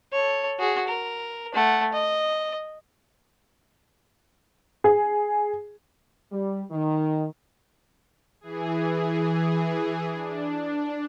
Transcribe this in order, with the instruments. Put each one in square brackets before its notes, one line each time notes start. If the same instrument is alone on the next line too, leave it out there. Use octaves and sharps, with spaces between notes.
[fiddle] A4 C#5
F#4 G#4
A#4
A3 F#5
D#5
[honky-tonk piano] G#4
[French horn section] G3
D#3
[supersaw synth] E3 G#4
D4